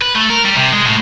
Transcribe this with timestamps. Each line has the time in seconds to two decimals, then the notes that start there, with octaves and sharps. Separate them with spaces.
0.02 B4
0.15 A3
0.30 A#4
0.45 G3
0.56 C3
0.73 G#3
0.86 A2